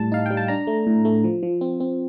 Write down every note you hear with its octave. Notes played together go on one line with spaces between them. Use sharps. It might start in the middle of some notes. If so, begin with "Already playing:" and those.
Already playing: A2 G3 A5
D#4 F5
G3 G5
A5
D4 A#5
A3
A2
A3
F3
F3
C4
C4